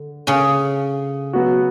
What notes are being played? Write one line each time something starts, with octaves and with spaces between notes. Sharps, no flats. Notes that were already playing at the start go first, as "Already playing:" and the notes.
Already playing: D3
C#3 C#4
F#3 B3 F#4